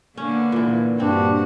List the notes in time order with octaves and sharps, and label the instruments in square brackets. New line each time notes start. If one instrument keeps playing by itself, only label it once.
[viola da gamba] D3 A#3 B3 [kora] C#4
[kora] A#2 E3
[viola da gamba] G2 A#2 F#4 [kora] E3 C4 [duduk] D4